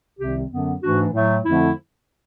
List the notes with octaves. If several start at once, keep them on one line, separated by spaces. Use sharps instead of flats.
C2 C3 D#3 G3 C4 G4
F#2 D3 F#3 B3
G#2 E3 A3 D4 F#4
A2 F#3 A3
F2 D3 F3 A3 C4 E4